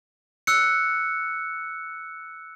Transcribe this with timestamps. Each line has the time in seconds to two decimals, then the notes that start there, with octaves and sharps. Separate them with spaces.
0.47 E6 F#6 C#7